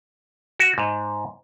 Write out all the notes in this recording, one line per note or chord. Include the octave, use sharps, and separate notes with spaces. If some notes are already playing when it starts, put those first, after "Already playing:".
F#4
G#2